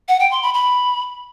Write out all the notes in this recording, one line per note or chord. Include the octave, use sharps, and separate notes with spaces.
F#5
G5
C6
B5
B5